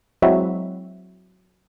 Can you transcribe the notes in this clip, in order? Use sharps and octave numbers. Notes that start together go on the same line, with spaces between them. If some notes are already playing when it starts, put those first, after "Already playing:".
F#3 G#3 C4 E4 F#4 E5